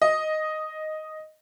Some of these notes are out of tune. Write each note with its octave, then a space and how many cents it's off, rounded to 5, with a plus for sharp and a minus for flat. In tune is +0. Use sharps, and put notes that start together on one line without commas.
D#5 +0